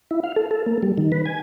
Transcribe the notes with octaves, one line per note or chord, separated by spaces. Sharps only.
E4
F5
A4
A4
A#3
G3
D#3
B4
G#5